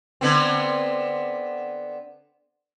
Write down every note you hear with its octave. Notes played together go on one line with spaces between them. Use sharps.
D3 B3 C4